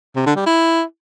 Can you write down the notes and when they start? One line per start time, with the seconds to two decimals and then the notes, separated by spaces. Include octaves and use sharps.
0.16 C3
0.26 D3
0.36 G3
0.46 E4